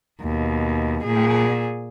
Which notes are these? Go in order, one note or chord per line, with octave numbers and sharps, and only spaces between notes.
D#2 B2
A#2 G#4